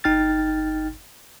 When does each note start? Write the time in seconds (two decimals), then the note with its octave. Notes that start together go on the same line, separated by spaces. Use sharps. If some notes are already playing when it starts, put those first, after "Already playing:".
0.04 G1 D#4 G5 F6 A6